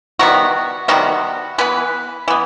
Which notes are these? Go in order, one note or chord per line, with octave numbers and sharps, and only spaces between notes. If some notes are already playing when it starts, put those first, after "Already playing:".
C3 D#3 G3 B3 F#4
C3 D#3 G3 B3 F#4
E3 B3 B4
E3 B3